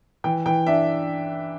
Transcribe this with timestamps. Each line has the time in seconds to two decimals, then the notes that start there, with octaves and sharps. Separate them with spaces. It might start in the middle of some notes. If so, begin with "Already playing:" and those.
0.24 E3 G5
0.46 E3 G5
0.67 D4 E5